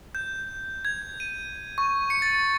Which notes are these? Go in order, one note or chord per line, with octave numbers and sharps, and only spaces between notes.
G6
G#6
D#7
C#6
C#7
A6